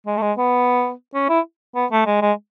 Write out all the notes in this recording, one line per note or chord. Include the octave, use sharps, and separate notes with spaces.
G#3
A3
G#3
B3
C#4
E4
B3
A3
G#3
G#3